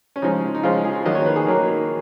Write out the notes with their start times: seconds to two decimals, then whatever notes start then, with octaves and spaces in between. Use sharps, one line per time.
0.16 C#4
0.22 C#3 F3 G#3 D#4
0.55 D#4
0.63 C#3 F3 G#3 F4
0.84 G#4
1.05 D#3 F#3 A#3 D#5
1.15 C#5
1.26 B4
1.36 G#4
1.46 D#3 F#3 A#3